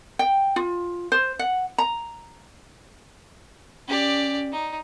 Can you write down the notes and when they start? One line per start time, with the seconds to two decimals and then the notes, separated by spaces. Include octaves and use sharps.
0.19 G5
0.56 F4
1.12 C5
1.39 F#5
1.78 A#5
3.88 C#4 G4 D5
4.52 D#4